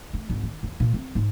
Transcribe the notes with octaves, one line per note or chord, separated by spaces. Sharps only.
A3
G#1
D#3
E2
A#2
C4
G#2